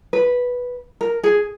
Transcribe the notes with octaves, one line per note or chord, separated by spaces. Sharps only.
B4
A#4
G#4